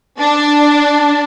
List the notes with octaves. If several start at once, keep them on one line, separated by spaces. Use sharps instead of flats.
D4